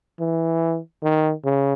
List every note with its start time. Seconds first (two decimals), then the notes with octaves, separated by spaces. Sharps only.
0.20 E3
1.03 D#3
1.45 C#3